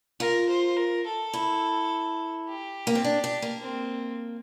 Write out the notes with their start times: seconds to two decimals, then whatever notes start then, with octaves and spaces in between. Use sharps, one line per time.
0.20 F4 A#4
0.49 C5
0.77 A#4
1.06 A4
1.33 E4
2.48 G4
2.87 A#3
2.95 C4
3.04 D4
3.24 D4
3.42 A#3
3.61 C4